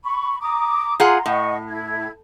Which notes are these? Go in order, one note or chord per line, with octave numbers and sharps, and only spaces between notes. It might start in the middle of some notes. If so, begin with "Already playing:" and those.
B5 C#6
A#5 D6 D#6
F4 G#4 F#5 A#5 C6
A2 D#5 F#5 C#6
E4 G#6